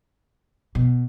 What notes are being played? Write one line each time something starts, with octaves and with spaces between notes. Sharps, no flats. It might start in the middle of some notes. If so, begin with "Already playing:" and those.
B2